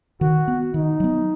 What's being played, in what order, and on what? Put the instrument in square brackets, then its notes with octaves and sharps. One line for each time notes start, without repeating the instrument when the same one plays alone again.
[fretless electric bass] D#3 [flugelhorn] F#4
[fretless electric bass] B3
[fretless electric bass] D#3 [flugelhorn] D#4
[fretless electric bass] F#3 B3